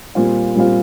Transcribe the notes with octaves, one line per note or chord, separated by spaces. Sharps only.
A#2 G3 C4 F4
A#2 G3 C4 F4